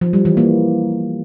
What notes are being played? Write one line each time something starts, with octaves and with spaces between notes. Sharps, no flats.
F3
G3
E3
A#3